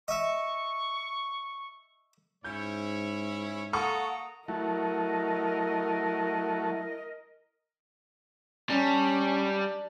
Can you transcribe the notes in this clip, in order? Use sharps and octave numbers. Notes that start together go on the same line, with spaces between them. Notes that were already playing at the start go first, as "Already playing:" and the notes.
D#5 E5 C#6
G#2 C#4 E4 C#5 G6
A#3 A4 F#5 A#5 C#6 D#6
F#3 A3 E4 A#4 D#5
G3 C#4 D4 A5 A#5